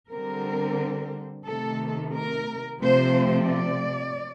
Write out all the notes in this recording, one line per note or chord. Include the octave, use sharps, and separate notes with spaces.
D3 G3 C4 A#4
C3 D#3 A3 A4
A#4
C3 F3 A3 C4 C5
D5